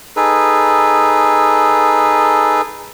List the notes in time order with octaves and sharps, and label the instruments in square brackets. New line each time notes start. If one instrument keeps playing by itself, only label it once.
[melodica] D#4 G#4 A4 B4